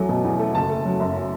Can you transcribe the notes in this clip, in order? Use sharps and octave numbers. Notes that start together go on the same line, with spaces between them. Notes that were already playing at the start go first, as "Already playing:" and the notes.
Already playing: E2 F#3 A3
B2
E2
A3
F#1 A5
A3
F#3
F#2